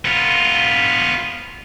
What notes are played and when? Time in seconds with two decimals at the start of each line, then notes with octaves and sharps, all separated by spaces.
0.05 B3 F4